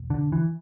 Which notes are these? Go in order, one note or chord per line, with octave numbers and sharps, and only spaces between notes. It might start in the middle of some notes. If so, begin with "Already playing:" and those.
Already playing: E1
D3
E3